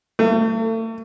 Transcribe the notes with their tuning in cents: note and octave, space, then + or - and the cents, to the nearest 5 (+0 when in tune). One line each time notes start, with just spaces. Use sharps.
A3 +40